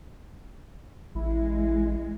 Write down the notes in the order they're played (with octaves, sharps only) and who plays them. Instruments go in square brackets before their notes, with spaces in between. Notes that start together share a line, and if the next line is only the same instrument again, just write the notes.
[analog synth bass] A1 [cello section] G#3 [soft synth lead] E4